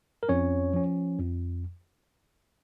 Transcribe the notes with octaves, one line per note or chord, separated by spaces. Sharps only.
A#4
F2 C#4 C#5
F3 C#4
F2